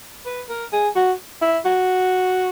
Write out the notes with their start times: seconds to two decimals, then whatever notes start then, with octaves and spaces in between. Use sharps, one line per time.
0.26 B4
0.49 A#4
0.73 G#4
0.96 F#4
1.42 E4
1.65 F#4